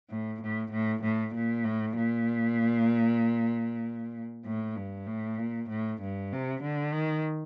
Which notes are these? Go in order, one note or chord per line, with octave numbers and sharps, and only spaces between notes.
A2
A2
A2
A2
A#2
A2
A#2
A2
G2
A2
A#2
A2
G2
C3
D3
D#3